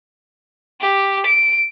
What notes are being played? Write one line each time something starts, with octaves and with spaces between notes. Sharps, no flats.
G4
D7